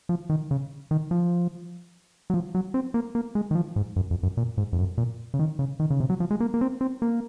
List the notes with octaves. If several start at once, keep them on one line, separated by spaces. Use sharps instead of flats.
F3
D#3
C#3
D#3
F3
F#3
F3
F#3
C4
A#3
A#3
G#3
D#3
F3
G#2
F#2
F2
F#2
A#2
G#2
F2
F#2
A#2
C#3
D#3
C#3
D#3
C#3
C3
F#3
F3
G#3
A#3
A#3
C4
C4
A#3